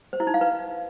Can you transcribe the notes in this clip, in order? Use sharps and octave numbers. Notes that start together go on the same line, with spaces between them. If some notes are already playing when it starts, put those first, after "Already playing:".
C5
E4
D#4
F5
B4